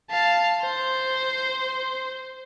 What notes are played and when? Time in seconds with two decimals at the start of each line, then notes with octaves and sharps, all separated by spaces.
0.11 F5 A5
0.61 C5